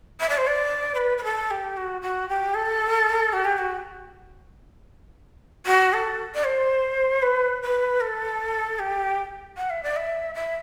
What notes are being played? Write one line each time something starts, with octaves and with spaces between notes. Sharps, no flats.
E5
D5
C5
D5
C5
B4
B4
A4
G4
F#4
F#4
G4
A4
F#4
G4
F#4
F#4
A4
D5
C5
B4
B4
A4
G4
F#5
E5
D5
E5
E5